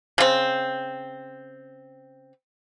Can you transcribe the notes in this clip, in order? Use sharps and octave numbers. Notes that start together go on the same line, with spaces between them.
C#3 C4